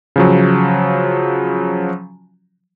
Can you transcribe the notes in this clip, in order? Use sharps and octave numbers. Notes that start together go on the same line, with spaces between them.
C#3 F3 F#3